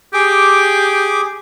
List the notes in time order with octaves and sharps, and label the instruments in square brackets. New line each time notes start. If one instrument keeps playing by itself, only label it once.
[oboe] G4 [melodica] G#4 D6